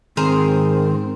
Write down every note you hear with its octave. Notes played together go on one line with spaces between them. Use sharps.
G#2 D#3 C4 G#4 A#4 C5